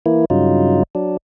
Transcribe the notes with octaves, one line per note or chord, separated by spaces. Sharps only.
E3 A#3 E4
G2 C#3 F#3 D#4 F4
F#3 D4